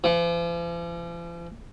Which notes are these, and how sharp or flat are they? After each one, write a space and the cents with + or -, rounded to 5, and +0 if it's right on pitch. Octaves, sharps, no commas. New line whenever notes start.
F3 -45